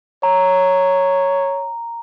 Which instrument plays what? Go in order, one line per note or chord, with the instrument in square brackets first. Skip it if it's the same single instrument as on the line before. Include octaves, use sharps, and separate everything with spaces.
[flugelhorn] C#5 [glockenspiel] A#5